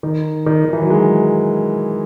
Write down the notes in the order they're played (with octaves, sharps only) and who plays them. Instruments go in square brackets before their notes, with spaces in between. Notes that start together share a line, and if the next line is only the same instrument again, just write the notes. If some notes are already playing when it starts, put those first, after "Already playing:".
[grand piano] D#3
D#3
D#3
E3
F#3
G#3